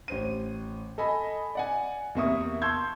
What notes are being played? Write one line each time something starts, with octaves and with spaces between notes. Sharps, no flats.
A1 C5 D#7
A4 D#5 G#5 B5
D5 F#5 G#5
E2 C3 A#3 E5 C#6 D#6
A5 C6 C#6 E6 G6 G#6